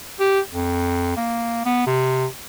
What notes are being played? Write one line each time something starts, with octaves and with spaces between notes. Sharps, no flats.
G4
F2
A#3
B3
C3